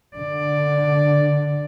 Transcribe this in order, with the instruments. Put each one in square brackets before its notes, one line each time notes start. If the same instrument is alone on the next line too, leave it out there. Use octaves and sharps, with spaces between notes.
[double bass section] D3 [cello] D5